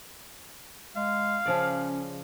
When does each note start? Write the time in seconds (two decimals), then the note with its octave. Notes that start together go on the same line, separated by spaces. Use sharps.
0.96 G#3 F5
1.46 C#3 F3 C#4 D5